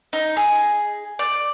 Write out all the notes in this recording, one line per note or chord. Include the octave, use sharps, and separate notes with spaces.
D#4
G#4
D5